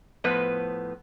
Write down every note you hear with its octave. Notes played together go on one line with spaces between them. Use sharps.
A2 F3 B3 B4 C5